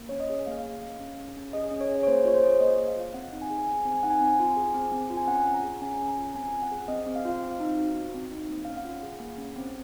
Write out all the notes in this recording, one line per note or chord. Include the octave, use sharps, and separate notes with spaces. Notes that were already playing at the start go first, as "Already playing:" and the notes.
Already playing: A#3
C#4 C#5
D#5
G#4
A#3 F5
A#3
C#4
C#4
G#4
C#4
G#4 D#5
C#4
C#5
G#4
C#5
A#3 C5
F4 C#5
C5
G#4
A#3 D#5
A#3
F5
F4
C4 F#5
D#4
G#5
G#4
C4 G#5
C4
G#5
D#4 F#5
G#5
C4
F4
G#4
C4
C4
F4
G#5
C#4 F#5
F4
A#5
G#4
C#4 G#5
C#4
A#5
F4
C4 G#5
F4
F#5
G#4
C4 D#5
C4
F5
F4
C4
D#4
F#4
C4
C4
D#4
A#3
C#4 F5
F#5
F4
G#4
A#3
C#4
C4